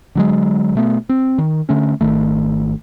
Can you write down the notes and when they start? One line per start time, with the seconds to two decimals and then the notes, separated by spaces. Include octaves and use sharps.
0.15 D3 F#3 G#3
0.75 B2 A3 B3
1.09 C4
1.38 D#3
1.69 D3 A3 C#4
2.01 G#1 D#3 A3